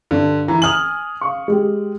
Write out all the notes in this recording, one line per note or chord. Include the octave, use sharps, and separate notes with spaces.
G2 D3
E3 A#5
G#5 D#6 F6 F#7
F5 C#6
G#3 G4